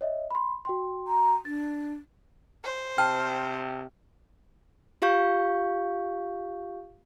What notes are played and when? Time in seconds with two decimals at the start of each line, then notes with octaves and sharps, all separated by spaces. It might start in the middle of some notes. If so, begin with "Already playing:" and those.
0.01 C#5 D#5 E5
0.31 B5 C6
0.65 F#4 G5 C6
1.07 A#5
1.45 D4 A6
2.64 C5
2.98 C3 G5 A5 F6
5.02 F4 G4 F5 C#6 G6